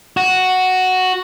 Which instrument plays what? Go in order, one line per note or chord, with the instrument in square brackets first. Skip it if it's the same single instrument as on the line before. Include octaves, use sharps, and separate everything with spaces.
[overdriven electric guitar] F#4